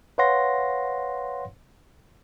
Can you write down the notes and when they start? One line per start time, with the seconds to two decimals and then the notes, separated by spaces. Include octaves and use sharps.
0.18 B4 C#5 F5 F#5 C6 A#6